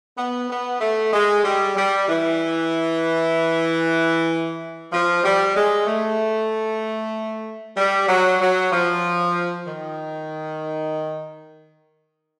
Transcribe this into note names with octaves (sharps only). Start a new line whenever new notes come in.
B3
B3
A3
G#3
G3
G3
E3
F3
G3
G#3
A3
G3
F#3
F#3
F3
D#3